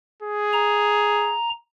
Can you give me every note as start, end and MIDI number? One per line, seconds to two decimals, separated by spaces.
0.23 1.38 68
0.53 1.50 82